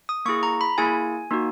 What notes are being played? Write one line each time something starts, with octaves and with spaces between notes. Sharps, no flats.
D#6
A#3 E4 G#4 C#6
A#5
B5
A#3 E4 G#4 G#5
A#3 D#4 F#4